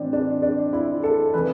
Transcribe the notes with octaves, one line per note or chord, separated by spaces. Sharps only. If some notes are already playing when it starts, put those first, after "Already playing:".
Already playing: A2 E3 C4 D4
D4
D4
E4
A4
C3 E3 B4